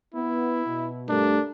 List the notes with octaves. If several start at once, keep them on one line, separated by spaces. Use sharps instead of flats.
B3 E4
B2
G2 A3 D4 A#4